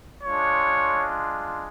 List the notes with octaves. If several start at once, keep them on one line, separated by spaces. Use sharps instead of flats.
G#3 D4 F4 C#5